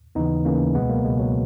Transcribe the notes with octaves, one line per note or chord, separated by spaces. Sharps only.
D#2 C#3 E3 B3 D#4
D#2 C#3 E3 A#3 C#4
C#2 B2 G#3 B3
F#3 A#3
C#2 B2 G#3
F#3